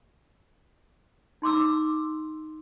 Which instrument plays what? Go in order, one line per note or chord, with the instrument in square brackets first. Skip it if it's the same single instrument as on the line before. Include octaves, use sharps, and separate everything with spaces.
[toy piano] D#4 C6 D6 E6